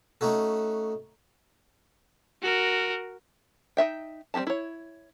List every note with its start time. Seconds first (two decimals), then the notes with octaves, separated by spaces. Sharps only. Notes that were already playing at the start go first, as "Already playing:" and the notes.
0.21 A3 C#4 D#4 F#4 A4
2.42 F#4 A#4
3.77 D#4 F4 E5 G5
4.34 G3 C4 E4 G4 A5
4.47 E4 C#5